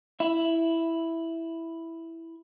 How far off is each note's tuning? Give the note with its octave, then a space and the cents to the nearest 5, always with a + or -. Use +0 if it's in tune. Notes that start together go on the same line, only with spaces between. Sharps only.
E4 +0 E5 +15